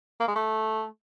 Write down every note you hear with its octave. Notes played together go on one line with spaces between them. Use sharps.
A#3
G#3
A3